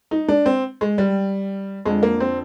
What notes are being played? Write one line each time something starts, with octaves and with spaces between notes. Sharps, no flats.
D#4
D4
C4
G#3
G3
F2 D3 G#3
A#3
C4